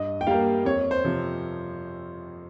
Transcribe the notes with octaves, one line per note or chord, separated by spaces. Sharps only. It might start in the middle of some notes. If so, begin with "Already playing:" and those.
Already playing: G2 D#5
G5
G3 A#3 F5
F2 C#5
C5
C3 F3